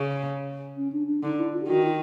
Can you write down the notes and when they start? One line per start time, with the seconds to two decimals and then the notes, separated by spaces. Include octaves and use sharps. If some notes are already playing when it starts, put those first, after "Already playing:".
Already playing: C#3
0.77 C#4
0.93 D4
1.07 D4
1.23 D3 D#4
1.38 E4
1.53 F4
1.62 G4
1.68 D#3 F#4
1.85 F4